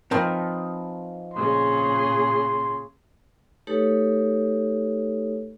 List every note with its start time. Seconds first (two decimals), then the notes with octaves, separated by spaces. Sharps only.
0.11 F3 C4 D#4 A#4 B4 A5
1.34 A#2 C#3 G#4 C6
3.67 A3 D#4 G4 A4 B4 C#5